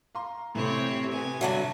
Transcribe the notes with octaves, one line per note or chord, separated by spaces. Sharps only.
F5 A#5 C6
A2 C3 E3 C4 C#5
B3 G#5
G2 D3 F#3 E5 F#5 A5